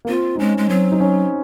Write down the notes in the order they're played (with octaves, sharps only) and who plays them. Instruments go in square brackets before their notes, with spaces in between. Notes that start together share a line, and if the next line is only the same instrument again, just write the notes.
[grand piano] A#3
[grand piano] C4 [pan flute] F4
[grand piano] D#4
[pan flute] G#3 [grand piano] C#4
[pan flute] G#3
[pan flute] F#3 [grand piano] C4
[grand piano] D#4
C#4